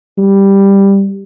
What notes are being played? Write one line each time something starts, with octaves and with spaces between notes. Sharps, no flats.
G3